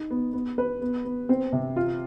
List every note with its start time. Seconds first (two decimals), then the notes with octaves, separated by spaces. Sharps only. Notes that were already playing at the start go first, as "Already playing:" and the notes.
Already playing: D#4
0.11 B3
0.33 B3
0.58 B4
0.81 B3
1.05 B3
1.29 C4
1.52 C3
1.76 F4